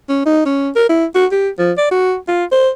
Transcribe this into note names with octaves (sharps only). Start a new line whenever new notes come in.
C#4
D#4
C#4
A#4
E4
F#4
G4
F3
D5
F#4
F4
C5